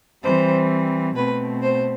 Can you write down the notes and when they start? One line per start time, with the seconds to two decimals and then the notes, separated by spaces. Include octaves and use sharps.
0.23 E3 G3 C4 C5
1.16 B2 A3 C4 B4
1.62 C5